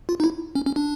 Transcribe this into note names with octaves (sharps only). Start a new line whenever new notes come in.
F4
D#4
E4
C#4
C#4
D4